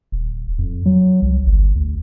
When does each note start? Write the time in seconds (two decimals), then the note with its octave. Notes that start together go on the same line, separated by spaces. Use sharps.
0.12 D#1
0.59 F2
0.86 F#3
1.22 C2
1.46 G1
1.76 D2